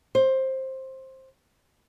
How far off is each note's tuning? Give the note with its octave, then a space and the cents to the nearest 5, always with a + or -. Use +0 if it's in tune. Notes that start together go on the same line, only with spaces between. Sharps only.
C5 +15